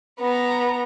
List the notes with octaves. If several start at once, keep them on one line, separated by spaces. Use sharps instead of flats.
B3 A#5